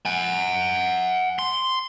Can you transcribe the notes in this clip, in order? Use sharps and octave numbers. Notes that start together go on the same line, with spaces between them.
F#5 G#5
C6